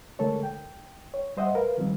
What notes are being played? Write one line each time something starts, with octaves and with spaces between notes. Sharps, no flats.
D3 G#3 A3 A4 A#4 C#5
G5
C#5
G3 C5 D#5 E5 F#5
A#4 B4 F5
D#3 F3 G3 C4